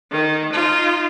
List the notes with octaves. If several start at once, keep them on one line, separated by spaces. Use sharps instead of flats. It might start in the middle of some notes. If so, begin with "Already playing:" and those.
D#3
D#4 F4